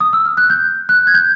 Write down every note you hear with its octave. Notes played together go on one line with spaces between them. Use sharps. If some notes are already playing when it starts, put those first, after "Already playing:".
D#6
E6
F6
F#6
G6
F#6
G#6
G6